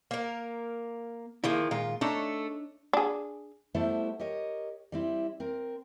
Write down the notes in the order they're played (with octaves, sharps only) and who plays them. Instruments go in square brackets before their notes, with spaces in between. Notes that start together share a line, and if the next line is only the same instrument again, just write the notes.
[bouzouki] A#3 A#4
[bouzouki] D#3 F3 A#3 [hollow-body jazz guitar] E4 G#4
[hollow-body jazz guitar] A#2 D#3 G#3 [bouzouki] F4
[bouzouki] A3 A4 [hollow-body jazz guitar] D4 D#4 C#5
[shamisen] D4 G#4
[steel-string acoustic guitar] G3 A3 B3 E4 A4 C5
G4 A#4 C#5 D#5
G3 C4 E4
C4 A#4